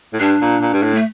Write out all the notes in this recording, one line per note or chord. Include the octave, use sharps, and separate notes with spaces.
A2
G2 D4
A#2
A#2
G2
A2
A3